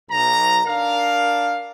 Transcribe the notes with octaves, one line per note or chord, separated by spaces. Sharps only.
B1 A#5
D4 A#4 F5